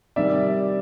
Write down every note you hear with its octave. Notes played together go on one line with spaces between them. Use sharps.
C3 D#3 G3 D5 E5